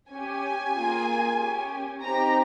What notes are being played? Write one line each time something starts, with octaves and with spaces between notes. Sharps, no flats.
C#4 G4 G#5
A#3 F4 G#4
C#4 G4
C4 D#4 G4 A#5